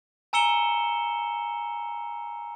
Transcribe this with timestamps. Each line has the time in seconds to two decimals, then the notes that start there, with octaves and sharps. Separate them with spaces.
0.33 G#5 A#5 E6 C#7 E7 G7